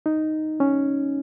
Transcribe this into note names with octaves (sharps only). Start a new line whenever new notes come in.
D#4
C#4